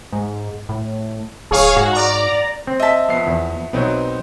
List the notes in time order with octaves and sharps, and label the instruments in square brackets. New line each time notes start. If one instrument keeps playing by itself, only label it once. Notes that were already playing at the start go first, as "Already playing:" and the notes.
[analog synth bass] G#2
A2
[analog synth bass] D1 [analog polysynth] G#4 C#5 F5
[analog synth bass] G#2 [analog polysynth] F#4
[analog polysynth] D5 A#5
[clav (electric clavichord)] C4
[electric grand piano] D#5 B6 [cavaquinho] E5 A5
[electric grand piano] F2 B3 C7
[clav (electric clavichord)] E2
[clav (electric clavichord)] B1 F#3 [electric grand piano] B3 C4 D#4